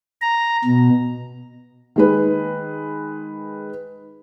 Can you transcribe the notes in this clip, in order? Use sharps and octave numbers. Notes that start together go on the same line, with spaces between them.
A#5
B2
D#3 G#3 B4